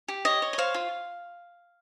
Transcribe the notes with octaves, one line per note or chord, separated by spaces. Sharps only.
G4
C#5 D#5
C#5
D#5
C5 F5
F4